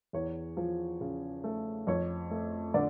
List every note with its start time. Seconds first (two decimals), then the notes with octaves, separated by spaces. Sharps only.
0.13 E2 C#5
0.57 F3
1.01 C#3
1.44 A3
1.87 F2 C#5
2.31 A3
2.74 D3 D5